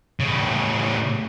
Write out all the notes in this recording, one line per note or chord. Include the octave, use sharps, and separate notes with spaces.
A2 C#3